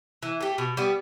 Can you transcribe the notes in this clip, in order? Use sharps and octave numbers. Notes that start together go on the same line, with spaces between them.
E3
A3 G4
B2
G3 B3